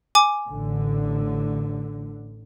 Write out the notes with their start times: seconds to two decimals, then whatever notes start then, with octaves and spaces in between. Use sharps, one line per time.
0.15 G#5 D6
0.50 A1 D3